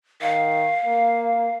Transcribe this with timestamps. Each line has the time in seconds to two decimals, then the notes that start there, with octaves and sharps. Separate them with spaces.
0.21 D#3 F5
0.85 A#3